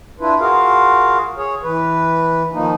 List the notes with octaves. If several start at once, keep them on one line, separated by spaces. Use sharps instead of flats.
D4 E4 F4 B4
F4 F#4 G#4 A#4 F5
G#4 C#5
E3 B4
D#3 F3 A#3 D#4